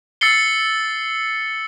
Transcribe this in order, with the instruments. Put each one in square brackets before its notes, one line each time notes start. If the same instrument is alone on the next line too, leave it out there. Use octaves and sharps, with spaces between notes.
[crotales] E6 A6 C7 C#7 G7